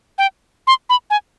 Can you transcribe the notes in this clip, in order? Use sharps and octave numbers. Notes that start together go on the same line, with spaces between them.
G5
C6
B5
G#5